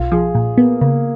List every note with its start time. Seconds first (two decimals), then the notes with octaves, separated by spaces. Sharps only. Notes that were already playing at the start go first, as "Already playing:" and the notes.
Already playing: B1 F4
0.12 F3 G#4
0.35 A#2
0.57 A#3 B3
0.81 C#3 A#3